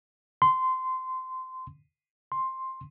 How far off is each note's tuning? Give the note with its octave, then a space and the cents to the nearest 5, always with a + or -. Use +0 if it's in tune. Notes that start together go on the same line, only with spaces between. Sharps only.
C6 -15
C6 +10